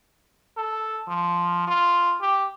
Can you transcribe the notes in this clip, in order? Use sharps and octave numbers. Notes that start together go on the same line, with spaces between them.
A4
F3
F4
G4